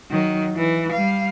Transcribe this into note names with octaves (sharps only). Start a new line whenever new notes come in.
D#3 F#3
E3
G3 F5